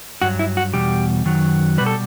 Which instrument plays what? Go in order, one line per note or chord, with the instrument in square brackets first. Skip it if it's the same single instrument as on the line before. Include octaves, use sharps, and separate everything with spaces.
[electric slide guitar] G2 F#3 F#4
E4
F#4
E2 B2 G3 G4
F#2 D#3 F#3
B2 G3 B4
A4